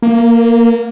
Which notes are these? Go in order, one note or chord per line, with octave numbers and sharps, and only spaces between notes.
A#3